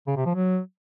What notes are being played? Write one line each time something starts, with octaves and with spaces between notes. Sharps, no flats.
C#3
C3
F3
F#3